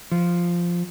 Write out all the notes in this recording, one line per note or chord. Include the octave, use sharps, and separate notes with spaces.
F3